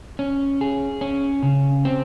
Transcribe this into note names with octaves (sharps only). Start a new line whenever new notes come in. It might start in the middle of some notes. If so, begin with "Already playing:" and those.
C#4
G#4
C#4
C#3
C4